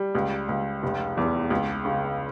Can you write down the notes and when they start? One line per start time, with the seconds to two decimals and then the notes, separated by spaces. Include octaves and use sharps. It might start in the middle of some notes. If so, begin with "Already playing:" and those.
Already playing: G3
0.15 C#2
0.49 C#2
0.83 F1
1.17 E2
1.50 C#2
1.85 C#3